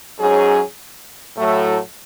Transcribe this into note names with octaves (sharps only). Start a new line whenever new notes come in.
G#2 F#3 C#4 G#4
A2 F#3 A3